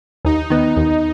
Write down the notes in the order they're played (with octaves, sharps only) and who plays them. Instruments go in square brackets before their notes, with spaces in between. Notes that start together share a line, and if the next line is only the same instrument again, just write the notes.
[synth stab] D#2 [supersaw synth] D#4
[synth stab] D#3 B3
D#2